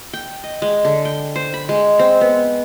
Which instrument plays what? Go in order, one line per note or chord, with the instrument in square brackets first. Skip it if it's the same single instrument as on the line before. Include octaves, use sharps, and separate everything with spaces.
[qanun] G5
D#5
G#3
D3
G5
C5
B5
G#3
C4
B3